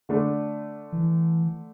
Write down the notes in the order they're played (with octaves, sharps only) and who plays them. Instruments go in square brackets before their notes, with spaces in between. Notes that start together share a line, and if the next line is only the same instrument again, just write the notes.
[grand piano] D3 A3 D4
[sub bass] E3